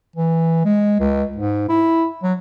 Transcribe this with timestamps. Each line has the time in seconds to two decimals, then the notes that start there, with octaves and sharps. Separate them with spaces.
0.16 E3
0.65 G#3
1.00 C#2
1.36 G#2
1.68 E4
2.23 F#3